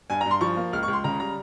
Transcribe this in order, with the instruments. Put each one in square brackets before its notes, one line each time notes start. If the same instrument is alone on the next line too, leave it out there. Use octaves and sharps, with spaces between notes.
[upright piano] G2 G#5
A#5
G2
C6
F3 C#6
A#3
C#2 F6
C#6
C#2
C6
C#3 A#5
G3 A#5